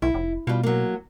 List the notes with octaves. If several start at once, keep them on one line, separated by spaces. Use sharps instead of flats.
B1 E4
F1
B2 G3 F4
F#3 A#3